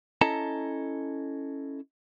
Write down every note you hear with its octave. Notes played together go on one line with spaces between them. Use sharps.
C#4 E4 A4 D#5 A5 A#5